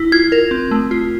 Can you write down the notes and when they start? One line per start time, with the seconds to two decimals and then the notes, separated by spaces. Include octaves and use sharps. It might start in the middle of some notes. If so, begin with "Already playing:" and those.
Already playing: E4
0.12 F4 G#6
0.32 A#4
0.51 C4
0.71 A3
0.91 F4